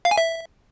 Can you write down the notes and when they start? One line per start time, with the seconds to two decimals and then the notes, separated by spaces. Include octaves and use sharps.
0.05 F5
0.11 G#5
0.18 E5